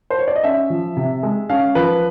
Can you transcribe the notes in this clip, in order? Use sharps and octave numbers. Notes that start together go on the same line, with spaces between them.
C5
C#5
D5
D#5
C#4 E5
F3
C3
G#3
C#4 F5
F3 B4